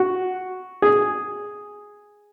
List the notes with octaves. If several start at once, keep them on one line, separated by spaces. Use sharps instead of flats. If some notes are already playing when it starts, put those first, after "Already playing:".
Already playing: F#4
G#4